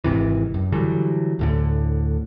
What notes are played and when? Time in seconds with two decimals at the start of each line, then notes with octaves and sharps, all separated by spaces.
0.04 G#1 G#2 C3 E3
0.54 F#2
0.72 D3 E3 F#3 G3
1.39 D2 A2 D3